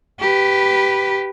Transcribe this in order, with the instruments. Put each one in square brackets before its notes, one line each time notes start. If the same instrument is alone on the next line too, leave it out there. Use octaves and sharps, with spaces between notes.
[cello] G4 B4